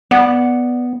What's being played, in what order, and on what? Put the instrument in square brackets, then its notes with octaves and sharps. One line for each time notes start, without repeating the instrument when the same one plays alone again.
[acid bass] B3 [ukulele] D5 F#5